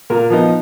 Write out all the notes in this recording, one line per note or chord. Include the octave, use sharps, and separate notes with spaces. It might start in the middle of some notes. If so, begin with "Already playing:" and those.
A#2 A#4
F3 B3 D#4